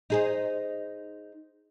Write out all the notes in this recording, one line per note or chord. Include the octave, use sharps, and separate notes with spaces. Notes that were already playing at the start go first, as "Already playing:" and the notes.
D#4 G#4 C5